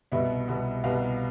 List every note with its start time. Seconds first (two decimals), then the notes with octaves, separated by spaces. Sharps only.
0.12 C2 B2 B3 E5
0.48 C2 B2 B3
0.84 C2 B2 B3 F5